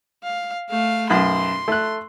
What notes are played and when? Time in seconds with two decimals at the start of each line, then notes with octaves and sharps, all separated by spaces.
0.23 F5
0.69 A3 F5
1.10 B1 F#2 C6
1.68 A3 F#6